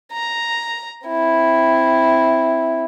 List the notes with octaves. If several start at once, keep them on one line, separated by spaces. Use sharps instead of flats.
A#5
C4 E4